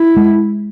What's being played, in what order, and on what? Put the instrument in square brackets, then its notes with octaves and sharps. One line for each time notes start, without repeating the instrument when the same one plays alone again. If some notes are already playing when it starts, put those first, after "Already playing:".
Already playing: [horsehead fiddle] E4
[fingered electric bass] G#3